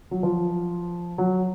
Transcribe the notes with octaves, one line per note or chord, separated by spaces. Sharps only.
F#3
F3
F#3